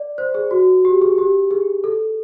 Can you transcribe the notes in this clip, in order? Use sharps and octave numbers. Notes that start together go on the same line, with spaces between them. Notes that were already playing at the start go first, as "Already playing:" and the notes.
Already playing: D5
C5
G#4
F#4
G4
G#4
G4
G#4
A4